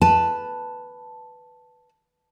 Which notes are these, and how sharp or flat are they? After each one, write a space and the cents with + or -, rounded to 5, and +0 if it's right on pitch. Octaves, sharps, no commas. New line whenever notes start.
B4 +0 A5 +0